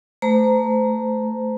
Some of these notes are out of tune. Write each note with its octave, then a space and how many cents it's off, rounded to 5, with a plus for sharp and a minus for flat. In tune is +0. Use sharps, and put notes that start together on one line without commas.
A3 +0 C5 -35 A#5 +0